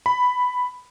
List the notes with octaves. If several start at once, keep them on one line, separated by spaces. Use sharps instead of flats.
B5